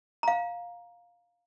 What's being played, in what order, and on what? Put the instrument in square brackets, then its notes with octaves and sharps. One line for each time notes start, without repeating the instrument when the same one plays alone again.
[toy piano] F5 A#5